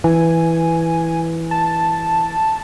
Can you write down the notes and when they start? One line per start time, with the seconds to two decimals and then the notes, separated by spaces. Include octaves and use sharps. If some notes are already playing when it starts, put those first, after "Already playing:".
0.04 E3 G#5
1.51 A5